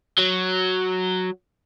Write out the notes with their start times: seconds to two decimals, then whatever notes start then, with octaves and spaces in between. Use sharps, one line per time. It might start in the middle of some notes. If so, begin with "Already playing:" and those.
0.18 F#3